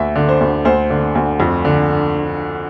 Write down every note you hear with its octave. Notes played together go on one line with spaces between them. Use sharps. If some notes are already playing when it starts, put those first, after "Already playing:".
Already playing: D2 E5
D3
C5
D2
D2 C5
D3
D2
F2
D3